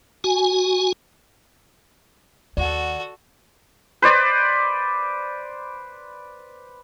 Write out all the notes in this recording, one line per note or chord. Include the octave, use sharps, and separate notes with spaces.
F#4 G#5
D#2 F#4 A4 D5 F#5
B4 C5 D5